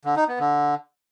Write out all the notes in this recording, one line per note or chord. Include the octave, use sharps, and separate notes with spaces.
D3
D#4
B3
D3